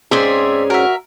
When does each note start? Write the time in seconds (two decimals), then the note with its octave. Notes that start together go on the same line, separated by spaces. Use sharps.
0.11 G#2 C4 C#4 G#4 D5 E5
0.70 F#4 A#4 E5